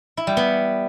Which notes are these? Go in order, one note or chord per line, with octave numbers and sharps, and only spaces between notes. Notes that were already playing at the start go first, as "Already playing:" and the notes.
E4
G3
B3